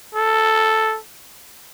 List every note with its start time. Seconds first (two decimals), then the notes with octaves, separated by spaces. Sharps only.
0.15 A4